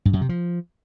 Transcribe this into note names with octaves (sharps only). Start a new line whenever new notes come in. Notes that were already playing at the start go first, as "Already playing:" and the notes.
G2
F#2
C3
F3